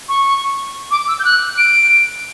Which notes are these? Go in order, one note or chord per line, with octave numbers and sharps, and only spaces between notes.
C#6
D6
E6
G6
F#6
D7